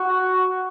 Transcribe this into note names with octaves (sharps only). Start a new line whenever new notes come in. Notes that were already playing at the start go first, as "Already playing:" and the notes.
Already playing: F#4